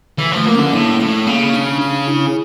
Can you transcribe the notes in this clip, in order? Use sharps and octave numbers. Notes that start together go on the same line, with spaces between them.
D3 E3
F3 A3
A#3
D3 C#4
A2 A#3
A2 A3
C#3 A#3
D4
D4
E4